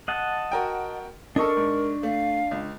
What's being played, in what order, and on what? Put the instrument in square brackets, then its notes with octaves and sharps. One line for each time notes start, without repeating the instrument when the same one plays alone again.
[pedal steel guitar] D#5 F#5 A5
[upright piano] F#4 A#4 G5
[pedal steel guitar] D4 C#6 [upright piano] A4 D#5 [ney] A#4
[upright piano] G#2
[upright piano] A3 [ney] F5
[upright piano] C#2